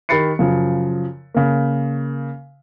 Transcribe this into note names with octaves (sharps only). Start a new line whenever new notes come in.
D#3 G4 B5 A6 C7 C#7
F#2 C#3 F3
C#3 A#3